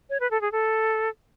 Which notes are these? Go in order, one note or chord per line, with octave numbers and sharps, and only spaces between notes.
C#5
B4
A4
G#4
A4